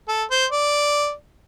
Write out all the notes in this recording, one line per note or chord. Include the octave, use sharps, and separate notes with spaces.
A4
C5
D5